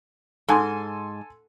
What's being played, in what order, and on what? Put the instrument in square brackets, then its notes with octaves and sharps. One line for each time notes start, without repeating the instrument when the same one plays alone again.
[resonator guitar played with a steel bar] G#2 [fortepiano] A4 G#5 C6